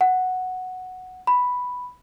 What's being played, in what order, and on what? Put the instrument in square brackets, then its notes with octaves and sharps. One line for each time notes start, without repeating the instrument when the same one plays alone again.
[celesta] F#5
B5